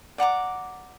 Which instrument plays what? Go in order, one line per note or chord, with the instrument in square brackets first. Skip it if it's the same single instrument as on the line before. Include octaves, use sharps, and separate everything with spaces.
[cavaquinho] D5 F#5 A#5 D6